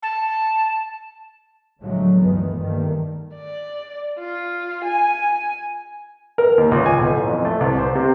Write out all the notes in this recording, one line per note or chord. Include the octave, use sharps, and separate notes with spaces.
A5
A2 D3 F3 F#3 G#3 A3
G1 D2 D#3 E3 G#3 B3
G2 D#3 G3 A3 A#3
D5
F4
G#5
A#4
D#2
C#2
G#5
B1
A1
F2
A3
C2
C5
C3